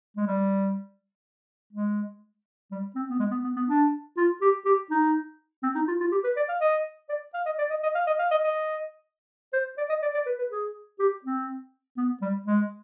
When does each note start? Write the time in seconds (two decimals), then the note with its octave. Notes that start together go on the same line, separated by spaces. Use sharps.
0.16 G#3
0.27 G3
1.73 G#3
2.71 G3
2.95 C4
3.09 B3
3.19 G#3
3.31 B3
3.44 B3
3.56 B3
3.68 D4
4.17 F4
4.41 G4
4.65 G4
4.90 D#4
5.63 C4
5.75 D#4
5.87 F4
6.00 F4
6.12 G4
6.24 B4
6.36 D5
6.49 F5
6.60 D#5
7.09 D5
7.34 F5
7.46 D#5
7.58 D5
7.70 D#5
7.83 D#5
7.95 F5
8.07 D#5
8.19 F5
8.31 D#5
8.44 D#5
9.53 C5
9.78 D5
9.89 D#5
10.02 D5
10.14 D5
10.26 B4
10.39 B4
10.51 G#4
10.99 G4
11.24 C4
11.97 B3
12.22 G3
12.46 G#3